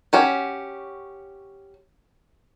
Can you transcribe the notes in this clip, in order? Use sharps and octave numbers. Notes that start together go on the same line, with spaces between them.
C#4 F#4 G4